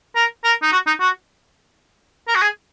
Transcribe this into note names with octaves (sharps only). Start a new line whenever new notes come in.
A#4
A#4
D#4
F#4
D#4
F#4
A#4
F#4
G#4